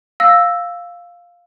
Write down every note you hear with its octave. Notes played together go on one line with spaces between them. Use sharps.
F5 E6 A#6